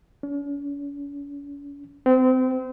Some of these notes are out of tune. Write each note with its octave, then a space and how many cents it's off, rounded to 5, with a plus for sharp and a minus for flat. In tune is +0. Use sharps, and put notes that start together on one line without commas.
C#4 +45
C4 -30